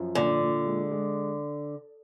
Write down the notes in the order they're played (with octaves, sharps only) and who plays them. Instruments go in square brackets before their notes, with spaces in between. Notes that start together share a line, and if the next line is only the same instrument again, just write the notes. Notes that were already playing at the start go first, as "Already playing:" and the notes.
Already playing: [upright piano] F#2 F3
[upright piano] A#2 [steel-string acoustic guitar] D3
[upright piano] A#2
G#3
G#3